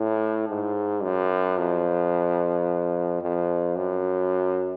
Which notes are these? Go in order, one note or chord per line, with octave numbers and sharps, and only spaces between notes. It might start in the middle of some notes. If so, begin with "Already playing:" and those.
Already playing: A2
G#2
F#2
F2
F2
F#2